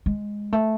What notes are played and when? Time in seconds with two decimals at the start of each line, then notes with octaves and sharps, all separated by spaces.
0.06 G#3
0.53 A3